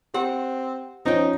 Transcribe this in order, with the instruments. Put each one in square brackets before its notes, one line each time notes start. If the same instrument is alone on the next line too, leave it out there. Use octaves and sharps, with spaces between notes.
[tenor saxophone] C4 [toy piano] G4 [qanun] F#5
[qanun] F3 G5 [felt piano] C#4 [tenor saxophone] D#4